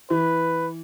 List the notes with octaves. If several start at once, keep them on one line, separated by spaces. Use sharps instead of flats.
E3 B4